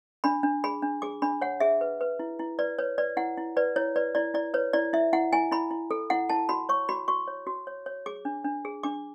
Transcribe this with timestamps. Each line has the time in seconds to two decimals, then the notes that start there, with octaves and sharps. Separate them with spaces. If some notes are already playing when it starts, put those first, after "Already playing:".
0.24 D4 B5
0.43 D4
0.64 G#4 B5
0.82 D4
1.02 G#4 D6
1.22 D4 B5
1.41 C#5 F#5
1.60 G#4 E5
1.81 B4
2.01 B4
2.19 E4
2.39 E4
2.59 B4 D5
2.79 B4 C#5
2.98 B4 D5
3.17 E4 F#5
3.37 E4
3.57 B4 D5
3.76 E4 C#5
3.96 B4 D5
4.15 E4 D5
4.34 E4 D5
4.54 B4 C#5
4.73 E4 D5
4.93 E4 E5
5.13 E4 F#5
5.33 E4 G#5
5.52 E4 B5
5.71 E4
5.91 A4
6.10 E4 F#5
6.29 E4 A5
6.49 F#4 B5
6.69 C#5 C#6
6.89 F#4 B5
7.08 F#4 C#6
7.28 C#5
7.47 F#4
7.67 C#5
7.86 C#5
8.06 G#4 D6
8.25 D4
8.45 D4
8.65 G#4
8.83 D4 D6